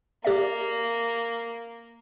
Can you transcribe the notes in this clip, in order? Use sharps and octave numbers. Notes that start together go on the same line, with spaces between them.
A#3 G4 D5 E5